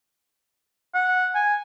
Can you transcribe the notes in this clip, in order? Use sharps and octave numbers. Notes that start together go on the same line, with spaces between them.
F#5
G#5